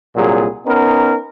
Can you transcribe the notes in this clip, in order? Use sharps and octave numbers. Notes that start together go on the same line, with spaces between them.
C2 A#2 F#3 G#4
B3 C#4 D#4 A#4